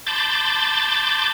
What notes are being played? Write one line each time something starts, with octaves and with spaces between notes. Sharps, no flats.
A5 B5 C6 D6 G6 A6